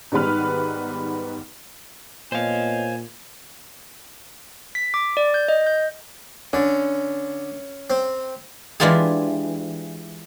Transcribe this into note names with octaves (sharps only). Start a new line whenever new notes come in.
G#2 D#3 G3 B3 B4 F6
A#2 B3 C5 C#5 D#5 F5 G#5
B6
D6
D5
G6
D#5
G6
D3 C#4
C4
E3 G#3 D4 F4 G4 G#4